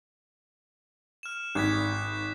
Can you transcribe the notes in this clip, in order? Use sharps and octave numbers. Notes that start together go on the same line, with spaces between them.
F6 E7
G#1 F#6 G#6 B6